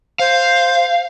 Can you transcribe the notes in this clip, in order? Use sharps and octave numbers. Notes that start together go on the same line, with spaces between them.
C5 F5